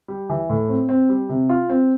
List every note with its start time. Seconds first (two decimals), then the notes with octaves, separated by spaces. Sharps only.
0.08 G3
0.30 E3
0.50 A2
0.68 C4
0.89 C4
1.09 G3
1.29 C3
1.49 F4
1.70 C4